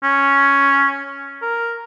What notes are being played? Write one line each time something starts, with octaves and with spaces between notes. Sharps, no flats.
C#4
A#4